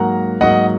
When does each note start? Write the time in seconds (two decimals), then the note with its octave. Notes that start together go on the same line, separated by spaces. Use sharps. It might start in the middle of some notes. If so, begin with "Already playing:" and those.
Already playing: G#2 F#3 A#3 F#5 A#5
0.41 G#2 F#3 A#3 D#5 F#5